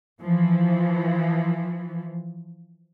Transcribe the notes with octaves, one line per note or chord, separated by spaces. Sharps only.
E3 F3